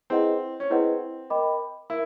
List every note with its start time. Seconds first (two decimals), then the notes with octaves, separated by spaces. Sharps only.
0.10 C4 E4 G#4 B4 D#5 F#5
0.60 C#4
0.70 C4 E4 G#4 B4 D#5 F#5
1.30 A#4 D#5 G5 B5 D6
1.90 E4 A#4